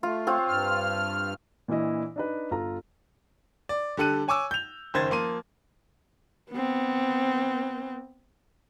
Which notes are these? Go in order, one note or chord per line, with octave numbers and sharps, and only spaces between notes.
A3 F4
C4 F4 C#5
G2 F6
A#2 E3 D4 E4 D#5
D4 D#4 B4
G1 F4 A4 A#5
D5
D3 G3 A4 F#6 D#7
C#5 G#5 C#6 D6 E6
G6 F7
F#1 D#3 C5 G#6 A6
F3 A#3 C6 D#7
B3 C4